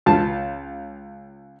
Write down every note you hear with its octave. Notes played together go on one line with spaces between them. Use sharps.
C#2 F4 A5